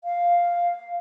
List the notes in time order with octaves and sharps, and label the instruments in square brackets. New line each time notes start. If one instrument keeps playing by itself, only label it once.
[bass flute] F5